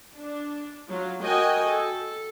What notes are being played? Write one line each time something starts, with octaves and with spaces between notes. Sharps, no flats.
D4
F#3 F4
F#4 A#4 D#5 G5 G#5
A4